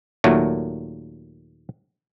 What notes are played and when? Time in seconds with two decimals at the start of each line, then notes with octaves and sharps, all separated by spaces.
0.24 D#2 A#2 F#3 A3